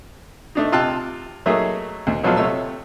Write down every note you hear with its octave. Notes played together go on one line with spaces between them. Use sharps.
A3 D4 D#4
C3 F4 G5 A5 E6 F#6
F#3 A3 A#3 D#4 G#4 E5
D2
A#1 F#3 B3 F4 A4 F6
C3 A3 C#5 E6